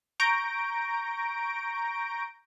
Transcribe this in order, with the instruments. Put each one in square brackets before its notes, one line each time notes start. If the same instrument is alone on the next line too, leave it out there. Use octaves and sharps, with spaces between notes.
[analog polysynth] A#5 C#6 G6 A#6 D7